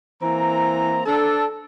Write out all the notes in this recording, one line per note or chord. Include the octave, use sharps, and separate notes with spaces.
E3 A#3 C4 A#5
D4 A4